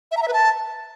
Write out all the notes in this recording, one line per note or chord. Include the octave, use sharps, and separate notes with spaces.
E5
A#5
E5
B4
A5